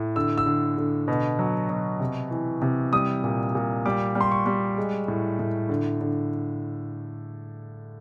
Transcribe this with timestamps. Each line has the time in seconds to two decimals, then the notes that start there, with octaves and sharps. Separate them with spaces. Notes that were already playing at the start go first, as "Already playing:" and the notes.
Already playing: A2
0.16 D3 E6
0.38 E6
0.46 D3
0.77 D3
1.08 B2
1.39 F#3
1.70 B2
2.00 C3
2.31 E3
2.62 C3
2.93 G3 D#6
3.24 A#2
3.55 A#2
3.86 G3 D6
4.15 G3
4.21 C6
4.31 C#6
4.46 G3
4.78 G#3
5.08 A2
5.39 A2
5.69 D3
6.01 D3